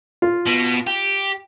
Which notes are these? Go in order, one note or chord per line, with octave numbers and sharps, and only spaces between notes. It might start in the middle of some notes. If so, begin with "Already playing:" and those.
F4
B2
G4